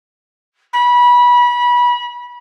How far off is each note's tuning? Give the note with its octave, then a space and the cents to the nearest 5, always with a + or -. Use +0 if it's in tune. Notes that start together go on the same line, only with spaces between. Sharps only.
B5 -25